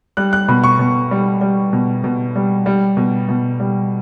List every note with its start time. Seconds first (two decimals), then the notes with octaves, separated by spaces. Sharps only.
0.17 G3 F#6
0.33 F#6
0.48 B2 B5
0.64 C#6
0.79 B2
1.11 G3
1.41 G3
1.73 B2
2.04 B2
2.36 G3
2.66 G3
2.97 B2
3.29 B2
3.60 G3